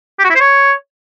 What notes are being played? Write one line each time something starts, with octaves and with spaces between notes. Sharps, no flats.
G4
F#4
E4
C5
C#5